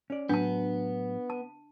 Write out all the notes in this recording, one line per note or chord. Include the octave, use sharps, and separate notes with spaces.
C#4 D5
A2 F#3 B3 D4 A5
A5